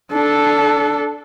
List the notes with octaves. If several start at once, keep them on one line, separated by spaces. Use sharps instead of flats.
D4 A4